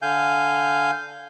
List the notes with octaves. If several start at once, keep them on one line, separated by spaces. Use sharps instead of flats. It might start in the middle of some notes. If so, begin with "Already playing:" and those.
D3 F5 G#5 G6